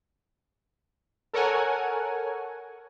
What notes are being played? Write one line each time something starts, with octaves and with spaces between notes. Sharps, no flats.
A4 A#4 C#5 F#5 G#5